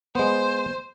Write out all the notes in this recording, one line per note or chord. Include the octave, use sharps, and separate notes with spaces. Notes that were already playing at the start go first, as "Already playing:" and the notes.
G#3 B3 C5